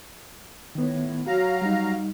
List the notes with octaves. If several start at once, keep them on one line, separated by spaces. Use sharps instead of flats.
A2 D#3 B3
F#3 F#4 F5 A#5
G3 D#4